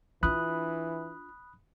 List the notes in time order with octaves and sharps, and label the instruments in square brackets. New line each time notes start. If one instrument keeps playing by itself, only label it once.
[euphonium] E3 [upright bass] D4 F4 [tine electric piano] B5 D#6 F#6